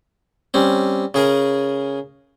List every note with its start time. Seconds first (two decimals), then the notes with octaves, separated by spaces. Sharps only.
0.54 G3 C4 C#4
1.14 C#3 G#4 A#4